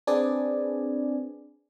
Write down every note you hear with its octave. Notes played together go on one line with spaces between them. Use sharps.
C4 D4 G#4 B4 D5 G#5